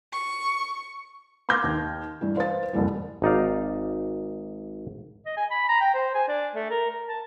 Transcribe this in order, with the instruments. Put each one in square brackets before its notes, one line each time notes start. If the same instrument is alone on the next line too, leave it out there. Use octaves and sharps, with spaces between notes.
[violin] C#6
[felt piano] C6 D6 F6 G6 G#6 A#6
D#2
G2 E3
B4 C5 F5 A6
F#1 C2 F2 E3 G3
[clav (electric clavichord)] G#1 D#4 D5 F5
[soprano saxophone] D#5
G#5
B5
A#5
G5
C5
G#5
D4
A3
A#4
A#4
A5